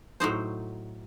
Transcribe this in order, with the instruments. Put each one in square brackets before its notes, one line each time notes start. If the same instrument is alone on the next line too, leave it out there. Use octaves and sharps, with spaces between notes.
[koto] A2 F#3 D#4 C5